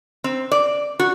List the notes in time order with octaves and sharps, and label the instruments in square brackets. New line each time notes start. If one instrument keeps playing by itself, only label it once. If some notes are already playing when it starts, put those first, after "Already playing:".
[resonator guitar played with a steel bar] C4
D5
F#4